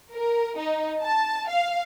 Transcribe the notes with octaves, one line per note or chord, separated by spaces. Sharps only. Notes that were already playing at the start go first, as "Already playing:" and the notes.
A#4
D#4
A5
F5